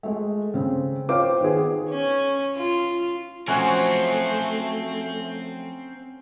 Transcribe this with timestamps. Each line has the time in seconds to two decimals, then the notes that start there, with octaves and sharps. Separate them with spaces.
0.03 G#3 A3
0.54 C#3 C4
1.09 F4 C5 C#5 F5 G5 D6
1.40 D#3 B3 G#4
1.89 C#4
2.56 F4
3.48 F3 F#3 A3 C4 C#4 A#4 F#5 G#5